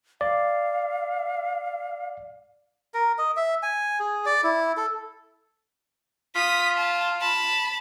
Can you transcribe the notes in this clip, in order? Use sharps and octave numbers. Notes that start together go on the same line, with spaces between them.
D5 F5
A#4
D#5
E5
G#5
G#4
D5
E4
A4
F4 D#6 B6
A5
A5 B5